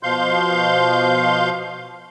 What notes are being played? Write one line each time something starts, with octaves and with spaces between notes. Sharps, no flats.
B2 F3 F5 C6 G6